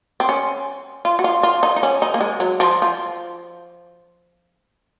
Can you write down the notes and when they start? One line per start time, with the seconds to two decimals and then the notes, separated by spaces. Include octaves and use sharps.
0.20 C4
0.29 C#4
1.05 F4
1.19 F#4
1.24 F4
1.43 F4
1.63 D#4
1.76 D#4
1.83 C#4
2.02 D#4
2.14 A#3
2.21 G#3
2.40 F#3
2.60 F3
2.82 F3